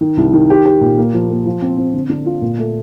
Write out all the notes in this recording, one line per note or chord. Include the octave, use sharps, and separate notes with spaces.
D#3
C2
D#3
G4
G4
A#2
A#3
F3
A#3
F3
C4
C4
D3
D3
F4
A#2
A3